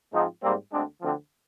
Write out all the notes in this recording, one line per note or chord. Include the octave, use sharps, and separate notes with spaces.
G#2 F3 G#3 C4 D#4
G#2 G3 A#3 C4
D2 D3 G#3 C4 D4
D2 D3 F3 C4